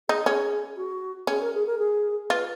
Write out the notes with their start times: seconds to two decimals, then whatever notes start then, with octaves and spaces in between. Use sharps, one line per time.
0.09 D#4 G#4
0.26 C#4 G#4
0.77 F#4
1.27 C#4 G#4
1.41 A#4
1.54 G#4
1.66 A#4
1.78 G#4
2.30 F4 B4